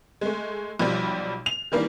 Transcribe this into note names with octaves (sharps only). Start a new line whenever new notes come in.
G#3 A3
B1 F3 G3
F7
D#3 E3 G3 A#3 D4